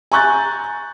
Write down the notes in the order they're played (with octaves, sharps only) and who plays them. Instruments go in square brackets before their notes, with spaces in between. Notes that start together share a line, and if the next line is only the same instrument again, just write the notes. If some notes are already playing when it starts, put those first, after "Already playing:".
[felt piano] G#5 A#5 C#6 F#6 G6 A6